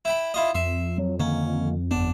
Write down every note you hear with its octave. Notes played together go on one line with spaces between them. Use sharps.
E4 G5 B5
E4 F4 D#5
F2 E5 C6
F#3
D3 D#3 A#3 C#4
G1 B3 D4